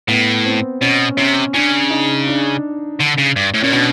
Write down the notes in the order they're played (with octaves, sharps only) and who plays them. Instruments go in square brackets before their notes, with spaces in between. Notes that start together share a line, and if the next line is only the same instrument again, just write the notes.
[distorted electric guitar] A2 [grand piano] B3
[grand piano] C4
[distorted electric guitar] B2 [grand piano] C#4
[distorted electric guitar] C3 [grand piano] C#4
[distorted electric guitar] C#3 [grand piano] D4
[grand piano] D#4
D4
[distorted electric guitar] D3
C#3
G2
A2
[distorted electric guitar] A#2 [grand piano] C#4
[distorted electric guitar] B2 [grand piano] D4